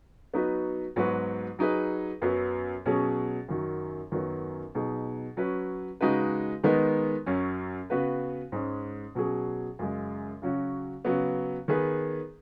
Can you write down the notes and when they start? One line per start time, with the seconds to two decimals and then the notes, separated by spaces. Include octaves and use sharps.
0.34 F#3 B3 D#4 F#4 B4
0.96 G#2 F#3 B3 F#4 B4
1.59 F#3 D#4 G#4 B4
2.22 F#2 F#3 B3
2.86 B2 F#3 C#4 G#4
3.48 F#2 D#3 F#3
4.12 F#2 D#3 F#3 B3
4.75 B2 F#3 D#4 G#4
5.37 F#3 C#4 B4
6.01 C#3 G#3 D#4 F#4 B4
6.63 D#3 G#3 B3 D#4
7.26 F#2 F#3 C#4
7.90 C#3 B3 F#4 B4
8.52 G#2 G#3 C#4
9.15 B2 F#3 C#4 G#4
9.79 F#2 C#3 G#3
10.42 C#3 F#3 C#4 F#4
11.05 C#3 F#3 B3
11.68 D#3 B3 G#4 B4